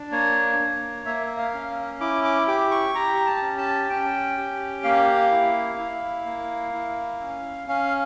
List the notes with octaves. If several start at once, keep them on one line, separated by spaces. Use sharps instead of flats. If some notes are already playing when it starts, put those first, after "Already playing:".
Already playing: D4
A#3 C#5
A#3
A#3 E5
E5
F5
C#4
E4 D6
D6
G4 D6
C#6
G4 A#5
A5
C#4
A5
C#4 G5
G4
A#3 F5
E4
E4
A#3
E4
C#4
C#4 F5